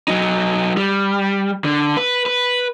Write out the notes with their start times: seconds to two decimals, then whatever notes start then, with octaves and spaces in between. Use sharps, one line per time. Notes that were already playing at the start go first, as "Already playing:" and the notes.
0.08 F#3 D#4
0.77 G3
1.64 D3
1.97 B4
2.26 B4